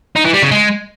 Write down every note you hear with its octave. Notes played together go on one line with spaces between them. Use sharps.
D#4
E3
G3
C#3
G#3